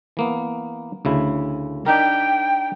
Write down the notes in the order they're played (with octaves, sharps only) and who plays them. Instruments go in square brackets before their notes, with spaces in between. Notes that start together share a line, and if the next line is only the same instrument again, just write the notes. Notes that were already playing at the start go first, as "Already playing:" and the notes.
[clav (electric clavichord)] E3 A#3 B3
D2 C#3 E4
[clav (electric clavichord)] D4 D#4 A#4 [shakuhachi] G5